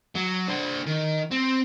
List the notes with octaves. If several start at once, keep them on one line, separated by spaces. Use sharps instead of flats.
F#3
D4 C5
D#3
C4